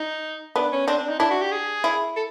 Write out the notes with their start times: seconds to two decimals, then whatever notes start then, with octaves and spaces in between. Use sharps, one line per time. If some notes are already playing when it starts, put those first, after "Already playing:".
Already playing: D#4
0.55 B3 D4
0.72 C#4
0.87 C4 D4
0.98 D4
1.09 D#4
1.19 D4 E4
1.30 F#4
1.41 G4
1.51 G#4
1.84 E4
2.16 A4